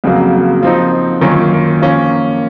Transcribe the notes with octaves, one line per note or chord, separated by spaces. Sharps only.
F2 C#3 F#3 A#3
F3 C4 D#4
F#2 D#3 A#3 C#4 F4
F3 A#3 C#4